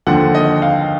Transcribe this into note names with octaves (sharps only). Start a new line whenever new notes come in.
D#2 D3 F3 F#5
D#5
F5